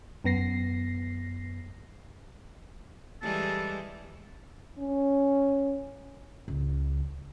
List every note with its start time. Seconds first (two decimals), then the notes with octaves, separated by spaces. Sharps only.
0.24 F#2 B3 A#6 C7
3.22 E3 G3 G#3 A4
4.79 C#4
6.48 C#2